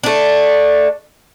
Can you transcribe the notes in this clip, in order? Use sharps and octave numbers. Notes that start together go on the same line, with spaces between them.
A3 D4